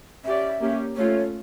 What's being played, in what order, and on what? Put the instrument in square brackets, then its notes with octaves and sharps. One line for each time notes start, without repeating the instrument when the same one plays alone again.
[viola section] C#4 G4 D5 [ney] E5
[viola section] A#3 C#4 G4
[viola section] A3 C#4 F4 [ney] C#5